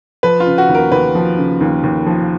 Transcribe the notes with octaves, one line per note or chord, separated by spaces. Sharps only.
F3 B4
F4
C#3
F#4
D#2
A#4
D#2 B4
F3
C#3
D#2
D#2
F3